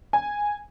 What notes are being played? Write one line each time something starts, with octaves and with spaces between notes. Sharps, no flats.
G#5